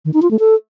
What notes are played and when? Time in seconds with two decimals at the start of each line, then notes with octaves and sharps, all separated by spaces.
0.05 D#3
0.14 D#4
0.22 F4
0.31 A3
0.39 A4